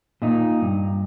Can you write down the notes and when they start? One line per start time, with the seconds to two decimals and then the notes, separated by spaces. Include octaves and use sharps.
0.22 A#2 D#4
0.61 G2